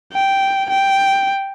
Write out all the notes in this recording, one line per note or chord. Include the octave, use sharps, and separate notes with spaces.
G5
G5